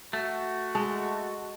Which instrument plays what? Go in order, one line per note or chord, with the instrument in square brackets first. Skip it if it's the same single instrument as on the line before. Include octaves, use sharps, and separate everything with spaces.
[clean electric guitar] A3 [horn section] F#4
[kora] G#3 [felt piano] A5